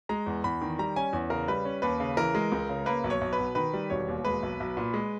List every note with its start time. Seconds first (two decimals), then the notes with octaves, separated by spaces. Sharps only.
0.09 G#3 A#5
0.26 E2
0.44 E2 B5
0.61 D#3
0.79 G3 A#5
0.96 C#4 G#5
1.13 E2
1.30 C#3 A#4
1.48 G3 B4
1.65 C#4
1.82 D#2 B4
2.00 C#3
2.17 E3 A#4
2.35 G#3
2.52 C#2
2.69 C#3
2.86 A#3 B4
3.04 B1
3.10 C#5
3.21 B1
3.33 B4
3.39 B2
3.55 D#3 B4
3.73 G3
3.90 E1 C#5
4.08 D#2
4.25 G#3 B4
4.43 B1
4.60 B1
4.77 A#2
4.94 G#3